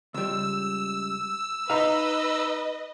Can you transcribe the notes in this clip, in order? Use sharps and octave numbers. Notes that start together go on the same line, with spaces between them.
C#2 G3 E6
D#4 B4 D#5 F5 A#5 B5